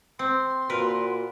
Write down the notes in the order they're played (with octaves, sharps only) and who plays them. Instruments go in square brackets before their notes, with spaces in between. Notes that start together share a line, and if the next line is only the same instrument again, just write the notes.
[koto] C4 [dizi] C6
[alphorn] A#2 [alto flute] F#4 [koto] A#4 B4